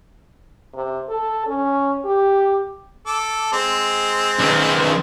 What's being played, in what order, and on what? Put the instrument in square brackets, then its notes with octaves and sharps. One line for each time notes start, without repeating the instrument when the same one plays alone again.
[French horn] C3
A4
C#4
G4
[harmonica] A4 D6
G#3 C4
[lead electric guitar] B1 D#3